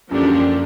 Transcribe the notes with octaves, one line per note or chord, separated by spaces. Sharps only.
F#2 D3 F3 A#3 D4 G4